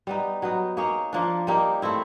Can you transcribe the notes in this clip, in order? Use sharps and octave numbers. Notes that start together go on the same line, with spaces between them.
G3 B3 D#4
F#3 B3 D#4
A#3 D#4 G#4 C#5
F3 A#3 D4
G3 A#3 D#4 G4
A3 C4 E4